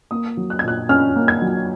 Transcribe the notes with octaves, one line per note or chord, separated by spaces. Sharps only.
A#3 D#6
F#3
F#6
G#6
A#2 F#6
C#4 F6
A#3
G#6
F#3